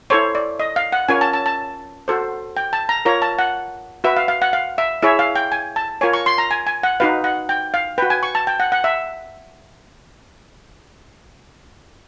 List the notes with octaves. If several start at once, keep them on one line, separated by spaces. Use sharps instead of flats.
E4 A4 C5 C#5
D5
D#5
F5
F#5
C#4 F4 A#4 C#5 G#5
A5
A5
A5
F#4 A4 C5
G5
A5
A#5
F4 A#4 C#5 A#5
A5
F#5
F#4 B4 E5
F5
F5
F#5
F5
E5
E4 G#4 C#5 E5
F5
G5
G#5
A5
F4 A#4 C#5 G#5
C#6
C6
A#5
G#5
G#5
F#5
D#4 F#4 B4 F5
F#5
G5
F5
F#4 B4 G5
G#5
C#6
A5
G5
F#5
F#5
E5